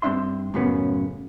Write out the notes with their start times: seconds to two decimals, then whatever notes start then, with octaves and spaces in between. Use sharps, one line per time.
0.02 G2 C4 D4 E5 C6
0.54 F#2 A2 C#3 F#3 B3 C#4